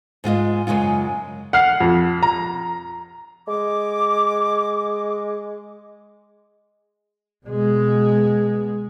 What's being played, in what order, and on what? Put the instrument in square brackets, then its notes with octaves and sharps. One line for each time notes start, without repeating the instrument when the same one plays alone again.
[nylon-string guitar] G#2 G#3 F4 D#5
F#2 C#3 G#3 F4
[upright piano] F#5 F6 C7
F2
A#5
[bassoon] G#3 [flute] D6
[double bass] B2 G#3